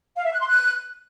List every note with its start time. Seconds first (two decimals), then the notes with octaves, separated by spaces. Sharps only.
0.16 F5
0.24 E5
0.32 F#6
0.40 C6
0.47 F#6